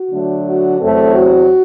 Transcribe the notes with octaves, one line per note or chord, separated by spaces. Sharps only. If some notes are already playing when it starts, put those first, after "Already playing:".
Already playing: F#4
D3 F#3 A3 D4
F#4
E2 C3 F#3 A3 C4 A4
F#4